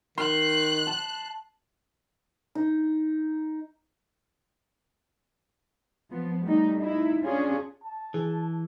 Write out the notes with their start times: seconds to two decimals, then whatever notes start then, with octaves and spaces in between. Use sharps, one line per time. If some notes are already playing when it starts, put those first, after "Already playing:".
0.18 D#3 C6 F#6
0.87 A5
2.55 D#4
6.11 F3 B3
6.44 G3 A3 D#4
6.81 D#4 E4
7.24 C#4 D4 F4 G#4
7.84 A5
8.14 E3 G#4